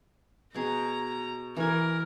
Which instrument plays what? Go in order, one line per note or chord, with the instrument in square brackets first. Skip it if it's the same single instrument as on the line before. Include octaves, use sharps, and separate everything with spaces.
[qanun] B2 G#4 [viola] A#5
[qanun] E3 G#5 [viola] A#4